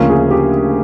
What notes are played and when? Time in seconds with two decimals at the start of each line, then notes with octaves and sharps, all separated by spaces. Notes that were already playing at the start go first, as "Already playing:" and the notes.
Already playing: D2 C#3 F3 A#3 C#4 A#4
0.10 G#4
0.31 G4